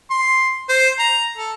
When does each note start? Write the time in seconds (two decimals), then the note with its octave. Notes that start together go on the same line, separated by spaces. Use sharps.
0.11 C6
0.69 C5
0.99 A#5
1.37 A4